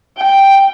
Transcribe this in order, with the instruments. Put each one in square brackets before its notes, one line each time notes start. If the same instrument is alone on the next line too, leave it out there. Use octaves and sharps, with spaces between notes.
[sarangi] G5